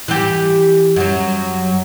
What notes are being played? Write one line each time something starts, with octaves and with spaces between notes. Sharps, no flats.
E3 G4
F#2 F#3